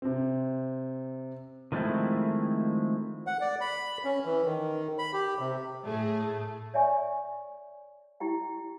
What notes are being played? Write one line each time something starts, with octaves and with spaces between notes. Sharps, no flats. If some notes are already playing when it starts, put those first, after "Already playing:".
C3 C4
D#3 F3 G#3 A3 C4 E4
F#5
D5
B5
C#4
E3
D#3
B5
G4
C3
A2 A3 G#4
C#5 D5 E5 G#5 C#6
E4 G4 G5